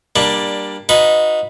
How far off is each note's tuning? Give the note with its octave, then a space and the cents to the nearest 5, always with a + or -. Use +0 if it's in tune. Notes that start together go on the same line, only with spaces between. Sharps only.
G3 +0 A#3 +10 D4 +10
D#4 +0 F#4 -30 B4 +0